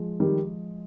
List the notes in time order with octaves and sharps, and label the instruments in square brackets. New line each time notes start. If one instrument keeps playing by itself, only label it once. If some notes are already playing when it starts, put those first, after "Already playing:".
Already playing: [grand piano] F3 G#3
[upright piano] D#3 G3